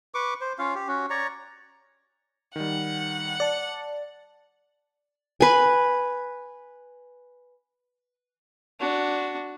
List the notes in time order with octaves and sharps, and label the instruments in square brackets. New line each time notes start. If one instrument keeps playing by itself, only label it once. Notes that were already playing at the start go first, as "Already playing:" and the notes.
[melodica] B4 C#6 D6
C5
C#4 F4 F5
G4
C#4 F#4
C#5 D5 A#5 C#6
[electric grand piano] D#3 G3 [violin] F#5
[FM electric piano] D5 [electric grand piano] A5 A6
[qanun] B4 G#5
[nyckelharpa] D4 F#4